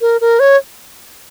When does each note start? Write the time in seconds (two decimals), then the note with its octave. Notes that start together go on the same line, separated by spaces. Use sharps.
0.01 A#4
0.21 A#4
0.40 C#5